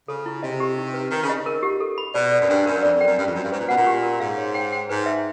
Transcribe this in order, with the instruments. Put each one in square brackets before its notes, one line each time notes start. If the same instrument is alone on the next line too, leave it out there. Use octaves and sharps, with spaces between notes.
[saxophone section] C#3 [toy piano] A4
[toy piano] E4
[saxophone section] C3 [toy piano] D#5
[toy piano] G4
D#4
B4
[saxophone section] D#3 [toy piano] D#4
[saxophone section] C#3
[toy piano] D#5
A#4
G4
A4
B5
[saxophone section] B2 [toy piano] D5
[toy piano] D5
[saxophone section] F#2
[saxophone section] G2 [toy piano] D4
[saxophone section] F#2 [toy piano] A#4
[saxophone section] F2 [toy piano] D5
[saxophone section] F2
[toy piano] G5
[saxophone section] F#2
[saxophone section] G2 [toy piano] C#4
[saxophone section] F2
[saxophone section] F#2 [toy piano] C#4
[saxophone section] G2
[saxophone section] G#2 [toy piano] B4
[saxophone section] A#2
[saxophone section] B2 [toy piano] F#5
[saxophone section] A#2
[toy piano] G4
A#4
[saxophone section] G#2 [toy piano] F5
[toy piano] C#5
G5
G5
[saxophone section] G#2 [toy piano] B4
[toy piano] E5